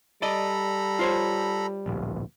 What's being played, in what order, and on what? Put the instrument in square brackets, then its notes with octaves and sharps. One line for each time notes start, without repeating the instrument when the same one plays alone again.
[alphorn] G3 [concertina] A4 A#5 B5 [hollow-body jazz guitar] D5 D#5
[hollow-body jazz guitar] F4 C5 C#5
[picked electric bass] D1 A#1